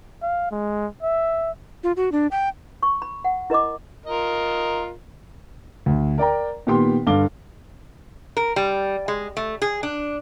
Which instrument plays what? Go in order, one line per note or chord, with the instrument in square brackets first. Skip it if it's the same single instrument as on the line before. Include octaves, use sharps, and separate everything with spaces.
[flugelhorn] F5
G#3
E5
[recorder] F4
F#4
D4
G5
[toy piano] C#6
B5
F#5
E4 A#4 D#5 B5 D6
[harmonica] F4 A#4 D#5
[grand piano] D2
A#4 D5 G5 A#5
A#2 D#3 B3 G4 G5 C6
G2 D3 F5 D6 G7
[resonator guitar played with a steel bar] A#4
G3
G#3
A3
G#4
D4